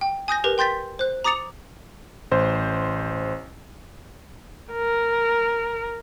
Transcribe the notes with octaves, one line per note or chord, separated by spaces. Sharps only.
G5
G#5 D#6 G6 A#6
G4 A#4 B4
G5 C6 G6 A6 B6
C5 F#6
A#5 D6 D#6 A6 C#7 F7
A1 C5
A#4